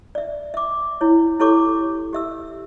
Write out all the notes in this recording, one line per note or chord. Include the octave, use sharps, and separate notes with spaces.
D5 E5
E5 D6
E4 C#5
E4 G4 A4 C#5 C#6 D6
G4 E5 E6